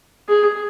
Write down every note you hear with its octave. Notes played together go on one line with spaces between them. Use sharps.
G#4